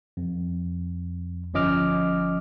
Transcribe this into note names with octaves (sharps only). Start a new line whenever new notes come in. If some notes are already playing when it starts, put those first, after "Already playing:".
F2
G1 F3 C#4 D#5 D6 F6